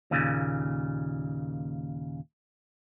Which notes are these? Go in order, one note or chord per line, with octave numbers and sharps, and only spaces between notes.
D#2 A#2 C#3